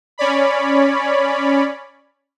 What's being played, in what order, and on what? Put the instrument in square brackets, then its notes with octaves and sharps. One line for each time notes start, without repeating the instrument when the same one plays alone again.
[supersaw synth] C#4 C#5 D5 B5